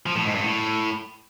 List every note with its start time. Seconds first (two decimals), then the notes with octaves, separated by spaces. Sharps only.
0.06 F3
0.16 A2
0.25 G#2
0.35 G2
0.44 A2